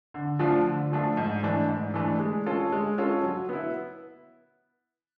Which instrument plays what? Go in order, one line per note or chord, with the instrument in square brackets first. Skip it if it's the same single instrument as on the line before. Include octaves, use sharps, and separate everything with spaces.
[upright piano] D3
F3 A3 D4 F4
D3
F3 A3 D4 F4
G#2
E3 A3 D4
G#2
E3 A3 D4
G#3
C#4 F4 A4
G#3
C#4 F4 A4
F#3
B3 E4